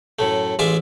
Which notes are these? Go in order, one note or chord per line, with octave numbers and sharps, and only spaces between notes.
F#2 A2 A3
A1 G#3 F4 E5 G#5 D6